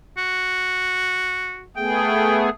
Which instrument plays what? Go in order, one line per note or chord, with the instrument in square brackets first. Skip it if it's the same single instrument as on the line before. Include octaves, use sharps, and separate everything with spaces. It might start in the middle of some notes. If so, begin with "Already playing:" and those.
[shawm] F#4
[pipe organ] A3 B3 G#4 [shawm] G5